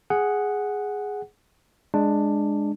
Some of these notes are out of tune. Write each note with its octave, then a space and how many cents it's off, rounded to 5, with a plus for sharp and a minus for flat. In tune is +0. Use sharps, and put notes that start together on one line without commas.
G#4 +0 F#5 +0
G#3 +0 D4 +10